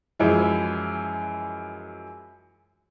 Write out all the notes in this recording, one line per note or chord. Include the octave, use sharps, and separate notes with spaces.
F#2 E3 F3 G#3